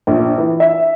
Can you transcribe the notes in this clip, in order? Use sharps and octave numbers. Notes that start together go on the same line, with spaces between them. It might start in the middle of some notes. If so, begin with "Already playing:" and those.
A#1
E3
E5